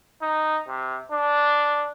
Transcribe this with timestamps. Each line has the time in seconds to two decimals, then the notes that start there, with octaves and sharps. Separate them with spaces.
0.22 D#4
0.68 C3
1.12 D4